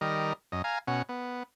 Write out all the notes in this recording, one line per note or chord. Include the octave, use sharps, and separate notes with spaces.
D#3 G3 A#4 D#5
F#2 D#5
F5 G#5 A#5
B2 C#4 F#5
B3